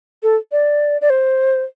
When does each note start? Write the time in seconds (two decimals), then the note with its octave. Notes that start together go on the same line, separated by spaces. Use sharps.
0.23 A4
0.52 D5
1.01 D5
1.10 C5